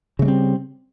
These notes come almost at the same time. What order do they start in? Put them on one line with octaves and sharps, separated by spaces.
C#3 A3 G3 C4